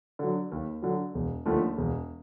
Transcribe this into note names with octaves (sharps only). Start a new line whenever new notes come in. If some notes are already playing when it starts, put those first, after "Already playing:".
D3 F#3
D#2
D3 F#3
E1
D#2 D3 F3 A3
E1